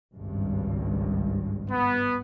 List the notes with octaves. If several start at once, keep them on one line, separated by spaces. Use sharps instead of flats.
G#1 C#2 G2
B3